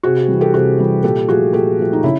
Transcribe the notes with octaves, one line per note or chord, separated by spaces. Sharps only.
C3 F#4 G#4
E3 G3
G4 A4
C3 F#4 G#4
E3 G3
A#2 G4 A4
F3 A3 F#4 G#4
A#2 G4 A4
F3 A3
D#4
C#3 E4